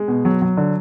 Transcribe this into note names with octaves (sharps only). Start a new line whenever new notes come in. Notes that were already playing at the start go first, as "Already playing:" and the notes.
Already playing: G#3
B2
F#3
F#3
D3